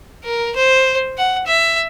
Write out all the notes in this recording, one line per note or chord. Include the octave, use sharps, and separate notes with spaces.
A#4
C5
F#5
E5